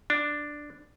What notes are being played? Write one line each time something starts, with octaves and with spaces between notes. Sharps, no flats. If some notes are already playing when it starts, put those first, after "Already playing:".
D4